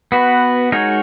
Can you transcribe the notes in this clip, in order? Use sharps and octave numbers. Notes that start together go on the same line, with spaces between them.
B3 F#4 B4
G#3 D#4 F#4 A#4 C#5